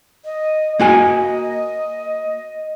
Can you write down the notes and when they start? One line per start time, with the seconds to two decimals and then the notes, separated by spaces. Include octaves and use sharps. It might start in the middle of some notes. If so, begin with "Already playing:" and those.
0.25 D#5
0.80 A#3 F#4 D#5 G#5